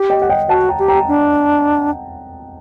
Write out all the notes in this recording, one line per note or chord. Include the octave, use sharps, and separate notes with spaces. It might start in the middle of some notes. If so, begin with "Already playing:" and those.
Already playing: G4
D#5 G5
F#5
D#5 G5
F#4 F#5 A5
G5 A#5
G4
G5 A#5
D4